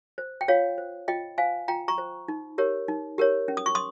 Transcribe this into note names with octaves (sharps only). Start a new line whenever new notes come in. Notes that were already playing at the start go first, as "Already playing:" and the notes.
C5
G5
F4 C#5 F5
C5
F4 D#5 G5
C5 F5 G#5
F4 G5 A#5
A#5 C#6
C5
D#4
G4 A#4 C#5
D#4
G4 A#4 C#5
C#4
D#6
C#6
C6 D#6